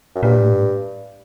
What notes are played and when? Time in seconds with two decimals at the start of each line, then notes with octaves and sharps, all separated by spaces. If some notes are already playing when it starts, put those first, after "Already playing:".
0.15 F#2
0.23 G2 A#2
0.38 A2
0.53 G#2